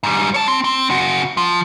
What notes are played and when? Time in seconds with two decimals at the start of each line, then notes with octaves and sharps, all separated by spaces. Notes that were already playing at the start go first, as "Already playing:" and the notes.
0.03 G#2 G3
0.34 C#5 A5
0.48 C4
0.64 C4
0.90 C#3 F#4
1.37 F3